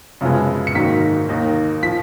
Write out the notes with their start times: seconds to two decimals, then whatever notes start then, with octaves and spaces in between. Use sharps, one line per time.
0.21 F#2 C#3 F3 G#3 B3
0.67 C#7
0.75 G#2 D#3 F#3 A#3 D#4 B6
1.29 D#2 D#3 A#3 D#4
1.83 F3 B6